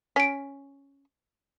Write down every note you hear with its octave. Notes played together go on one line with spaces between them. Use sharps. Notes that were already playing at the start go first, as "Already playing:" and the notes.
C#4 B6 D7